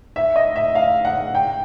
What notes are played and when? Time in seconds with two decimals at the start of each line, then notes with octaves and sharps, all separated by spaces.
0.16 E5
0.36 D#5
0.56 E5
0.75 F5
1.05 F#5
1.35 G5